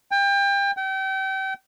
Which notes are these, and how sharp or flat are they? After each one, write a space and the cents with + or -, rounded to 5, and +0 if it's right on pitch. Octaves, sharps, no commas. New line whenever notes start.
G5 +30
G5 -35